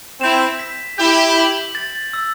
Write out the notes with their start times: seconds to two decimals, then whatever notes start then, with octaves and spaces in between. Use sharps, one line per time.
0.21 C4 E4 E7
0.59 B6
0.98 E4 G4 G6
1.36 F#7
1.75 A6
2.13 E6